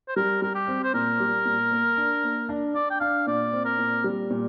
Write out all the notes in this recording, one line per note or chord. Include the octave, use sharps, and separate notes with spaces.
C5
G3 A#4
G3 A#4
G4
C4
C5
A#2 A#4
G3
A#2
A#3
D4
A#3
D4
D4 D5
G5
D4 F5
A#2 D5
C4
A#4
A#2
G3
A#2